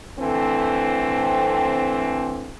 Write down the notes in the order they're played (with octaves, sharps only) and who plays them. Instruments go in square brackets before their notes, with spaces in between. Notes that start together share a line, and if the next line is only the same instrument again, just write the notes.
[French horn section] D3 E3 A3 C4